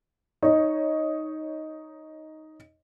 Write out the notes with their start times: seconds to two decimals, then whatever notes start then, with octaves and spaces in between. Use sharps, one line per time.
0.43 D#4 C#5